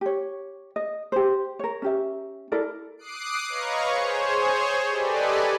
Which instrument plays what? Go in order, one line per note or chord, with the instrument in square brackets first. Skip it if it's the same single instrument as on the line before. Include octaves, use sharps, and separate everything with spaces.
[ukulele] G4 C#5
D#5
G4 C5
A#4 C#5
C#4 G4 E5
E4 A4 A#4 D5
[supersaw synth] D6 D#6 F#6 C7 D7
B4 C#5 D#5 F5 A#5 C#6
G#4 C5 C#5
G4 A4 B4 D5 D#5 G#5